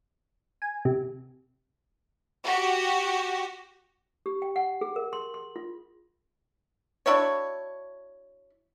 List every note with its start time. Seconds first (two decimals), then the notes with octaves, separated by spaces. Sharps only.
0.62 G#5
0.85 C3
2.45 F#4 G4
4.26 G4
4.42 G5
4.56 F#5
4.81 G#4
4.96 A#4
5.13 C6
5.34 C6
5.56 F4
7.06 D4 E4 F#4 C#5